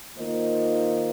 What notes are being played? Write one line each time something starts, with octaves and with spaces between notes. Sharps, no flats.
D#3 A#3 F4 C5 D#5